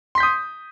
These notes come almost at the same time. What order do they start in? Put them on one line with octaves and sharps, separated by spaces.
C6 B6 G6 D#6